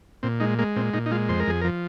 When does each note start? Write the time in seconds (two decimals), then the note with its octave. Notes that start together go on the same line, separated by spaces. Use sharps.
0.23 A#2 C4
0.40 G#3 D#4
0.59 G#3 A#3
0.76 A#2 C4
0.94 A#2 D#4
1.06 D#4
1.11 G#3 F4
1.28 F2 C5
1.40 A#4
1.47 F2 G#4
1.61 A#4
1.64 F3